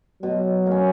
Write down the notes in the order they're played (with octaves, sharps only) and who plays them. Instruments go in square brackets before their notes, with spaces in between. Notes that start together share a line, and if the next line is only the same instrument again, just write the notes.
[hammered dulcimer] B2 [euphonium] F#3
[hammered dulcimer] A#3 C#4